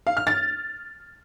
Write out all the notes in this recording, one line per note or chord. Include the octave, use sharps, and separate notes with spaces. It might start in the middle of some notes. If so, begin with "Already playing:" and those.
F5
F6
A6